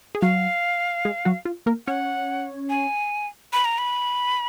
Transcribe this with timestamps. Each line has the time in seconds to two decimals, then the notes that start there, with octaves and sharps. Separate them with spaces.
0.15 G#4
0.22 F#3 F#4 F5
1.05 G#3 G#4
1.25 F#3 F#4
1.45 F4
1.66 A#3 A#4
1.87 C#4 C#5 F#5
2.69 G#5
3.53 B5
3.65 A#5
3.78 B5